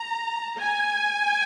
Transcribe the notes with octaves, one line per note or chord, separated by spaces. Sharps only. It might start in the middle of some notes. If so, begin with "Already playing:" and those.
Already playing: A#5
G#5